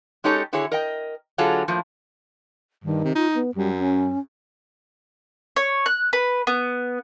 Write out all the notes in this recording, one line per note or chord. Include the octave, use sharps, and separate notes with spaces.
G#3 C#4 D#4 G4 A4 C#5
D3 E4 F#4 G#4 C#5
A#4 D#5 G5
D3 F#3 F4 G#4 A4
A2 F3 A#3
G2 D#3
C3
D#4 F4
B3
F#2 G3
C#4
C#5
F#6
B4
B3